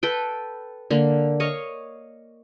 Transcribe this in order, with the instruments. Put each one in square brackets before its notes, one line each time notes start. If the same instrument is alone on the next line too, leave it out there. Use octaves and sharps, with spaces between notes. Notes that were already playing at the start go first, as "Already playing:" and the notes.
[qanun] A4 B4 G5
D3 A#3
C#5 D#5 F5 C#6